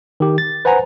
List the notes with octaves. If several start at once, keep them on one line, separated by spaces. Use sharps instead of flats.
D#3 G4
A6
B4 C5 F#5 G#5 A#5